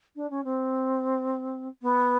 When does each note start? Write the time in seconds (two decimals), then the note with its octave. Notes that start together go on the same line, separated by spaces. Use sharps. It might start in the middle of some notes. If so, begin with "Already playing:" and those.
0.15 D4
0.30 C#4
0.44 C4
1.81 B3